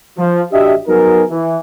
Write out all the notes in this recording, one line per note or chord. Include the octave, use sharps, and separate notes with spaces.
F3
A1 D4 F#4 G4 D#5 E5
F#3 B3 D#4 F#4 G#4 A#4
E3